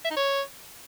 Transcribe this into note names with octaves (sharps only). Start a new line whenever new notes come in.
E5
D#4
C#5